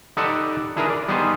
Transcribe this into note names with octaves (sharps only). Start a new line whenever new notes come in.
D#4 G4 A4 B4 D5 F#5
D4 E4 G#4 A#4 B4
D5
G3 B3 D#4 G#4 B4 C5